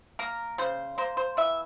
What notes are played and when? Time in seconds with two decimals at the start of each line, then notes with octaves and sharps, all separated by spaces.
0.19 A#3 A#4
0.58 C#3 C5
0.98 A#3 C5
1.17 C5
1.37 E3 E5